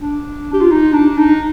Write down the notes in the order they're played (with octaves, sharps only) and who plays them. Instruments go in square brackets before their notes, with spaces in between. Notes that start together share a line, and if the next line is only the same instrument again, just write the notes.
[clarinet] D4
G4
F4
D#4
D4
D#4